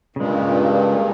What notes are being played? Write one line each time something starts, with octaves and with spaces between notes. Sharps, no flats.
G2 A#2 C#3 G#3